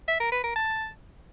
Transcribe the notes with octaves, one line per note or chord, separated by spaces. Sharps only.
E5
A#4
B4
A#4
A5